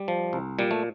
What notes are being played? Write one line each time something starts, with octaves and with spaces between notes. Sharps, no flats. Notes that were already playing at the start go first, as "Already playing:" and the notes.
Already playing: G3
F3
C2
A#2 G3
A3